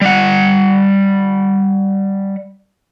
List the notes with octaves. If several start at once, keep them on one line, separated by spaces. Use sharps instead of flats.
G3 F#5